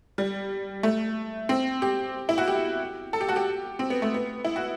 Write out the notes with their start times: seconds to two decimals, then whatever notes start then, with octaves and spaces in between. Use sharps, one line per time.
0.18 G3
0.83 A3
1.49 C4
1.82 G4
2.29 E4
2.38 F#4
2.48 G4
3.13 A4
3.21 G4
3.28 F#4
3.36 G4
3.79 C4
3.90 B3
4.02 A3
4.14 B3
4.45 E4
4.56 F#4